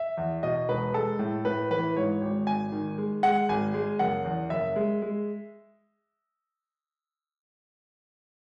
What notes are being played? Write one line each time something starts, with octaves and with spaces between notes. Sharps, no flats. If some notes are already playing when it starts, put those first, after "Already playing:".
Already playing: E5
E2
B2 D#5
E1 B4
G#3 A4
A2
A2 B4
E3 B4
G#2 C#5
G#1
G#1 G#5
D#3
G#3
G#3 F#5
G#1 G#5
G#3
F#1 F#5
E2
F#1 E5
G#3
G#3